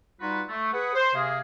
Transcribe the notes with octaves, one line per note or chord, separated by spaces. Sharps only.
G3 D#4 F4 F#4 B4
A3
G#4 B4 F#5
C5
C3 A#3 G#4